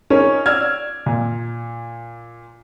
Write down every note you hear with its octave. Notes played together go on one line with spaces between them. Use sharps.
C#4 D#4 G#4 A#4 C#5
D5 E6 F6 G#6
A#2